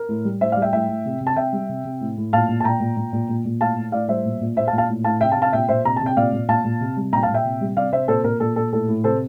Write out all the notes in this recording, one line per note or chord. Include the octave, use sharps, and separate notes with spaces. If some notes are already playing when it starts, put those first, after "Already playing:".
Already playing: A#4
A2
G3
A2 C5 E5
D5 F5
G3
E5 G5
A2 E5 G5
A2
C3
C3
A5
C3 E5 G5
G3
C3
C3
A2
A2
A#2 F5 A5
A#2
A5
A#2 G5 A#5
A#2
A#2
A#2
A#2
A#2
A2 F5 A5
A2
A2 D5 F5
G3 C5 E5
A#2
A#2
A#2 C5 E5
F5 A5
A#2
F5 A5
A2
A2 F5 A5
C3 E5 G5
F5 A5
C3
F5 A5
A#2 E5 G5
A#2 C5 E5
C3 A#5
C3 A5
G5
A#2 D5 F5
A#2
A#2 F5 A5
A#2
C3
G3
A#2 G5 A#5
F5 A5
A#2
E5 G5
C3
G3
C3 D5 F5
C3 C5 E5
A#2 A4 C5
A#2 A#4
A#2 A4
A#2 A4
A2 A4
A2
C3 A4 C5